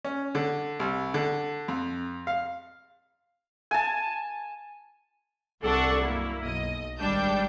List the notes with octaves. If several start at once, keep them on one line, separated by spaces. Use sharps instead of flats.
C#4
D3
C2
D3
F2
F5
G#5 A5
C2 C3 D4 A4 F#5 C#6
F#2 A#3 E4
B1 D#5
G#1 G3 D4 G5 A5 G6